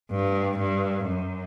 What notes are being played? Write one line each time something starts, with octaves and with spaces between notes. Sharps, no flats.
G2
G2
F#2